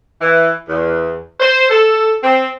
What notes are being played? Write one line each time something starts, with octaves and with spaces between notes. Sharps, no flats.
E3
E2
C5
A4
C4